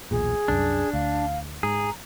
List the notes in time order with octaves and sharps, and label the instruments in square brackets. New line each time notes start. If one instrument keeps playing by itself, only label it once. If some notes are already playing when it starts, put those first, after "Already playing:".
[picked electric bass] B1 E2 A#2 [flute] G#4
[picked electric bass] C2 F#2 [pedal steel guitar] D4
[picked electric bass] D2 [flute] F5
[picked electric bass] G#2 [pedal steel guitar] G#4 [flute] A#5